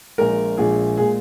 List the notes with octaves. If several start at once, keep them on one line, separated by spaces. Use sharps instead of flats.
A#1 A#2 G#3 A#4
A#1 A#2 G#3 G#4
A#2 G#3 G#4